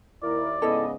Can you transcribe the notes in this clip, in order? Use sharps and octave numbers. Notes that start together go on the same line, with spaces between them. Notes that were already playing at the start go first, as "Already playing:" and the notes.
D#2 E4 A#4 D5
G#2 C#3 B3 E4 A4 D#5